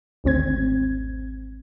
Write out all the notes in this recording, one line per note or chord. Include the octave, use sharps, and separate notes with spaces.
G#1 D2 C4 G#6